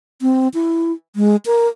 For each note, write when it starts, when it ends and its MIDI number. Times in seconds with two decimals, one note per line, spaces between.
0.22 0.48 60
0.54 0.92 64
1.16 1.36 56
1.46 1.68 70